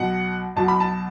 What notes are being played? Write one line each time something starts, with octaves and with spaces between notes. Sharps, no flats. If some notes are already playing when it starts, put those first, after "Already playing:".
Already playing: B1 B2 F#3 F#5
B1 B2 F#3 A5
B5
A5